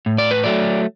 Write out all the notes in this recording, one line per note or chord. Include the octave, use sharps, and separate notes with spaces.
A2
D5
B4
F#3 A3 D5